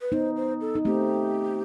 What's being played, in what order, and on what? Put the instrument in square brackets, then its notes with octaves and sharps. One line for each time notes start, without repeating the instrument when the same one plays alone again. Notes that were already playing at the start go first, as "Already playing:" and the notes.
[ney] B4
[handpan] B3 D#4 [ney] C5
[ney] C5
A4
[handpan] D#4
[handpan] A3 C4 [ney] G4